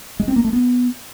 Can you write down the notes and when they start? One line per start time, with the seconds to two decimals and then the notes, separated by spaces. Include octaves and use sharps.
0.20 G#3
0.28 C4
0.36 A#3
0.45 A3
0.53 B3